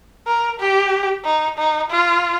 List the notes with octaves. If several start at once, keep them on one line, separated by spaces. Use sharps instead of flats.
A#4
G4
D#4
D#4
F4